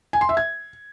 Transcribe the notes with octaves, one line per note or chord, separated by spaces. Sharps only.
G#5
C6
E5
G#6